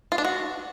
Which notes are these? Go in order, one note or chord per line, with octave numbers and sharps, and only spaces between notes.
F4
D4
F#4